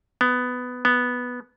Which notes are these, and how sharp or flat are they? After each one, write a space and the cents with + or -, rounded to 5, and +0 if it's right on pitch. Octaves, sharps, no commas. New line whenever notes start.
B3 +10
B3 -5